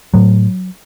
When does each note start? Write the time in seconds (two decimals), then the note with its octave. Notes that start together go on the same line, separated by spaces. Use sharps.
0.14 A2 F#3